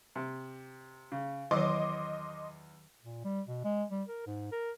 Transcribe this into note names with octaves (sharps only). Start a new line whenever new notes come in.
C3
C#3
E2 D#3 F#3 C#5 D#5 C6 D6
A#2
G3
B2
G#3
G3
A#4
G#2
A#4